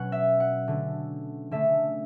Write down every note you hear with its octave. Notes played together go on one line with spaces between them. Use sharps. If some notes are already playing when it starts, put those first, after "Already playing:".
Already playing: B2 F#3 C#4 F#5
E5
F#5
D3 A3 C#4
D3 A3 C#4 E5